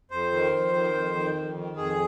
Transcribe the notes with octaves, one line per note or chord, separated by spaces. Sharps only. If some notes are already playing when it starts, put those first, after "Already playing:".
F2 C5
D#3
F2
D#3
F2
D#3
F2
D#3
F2 G#4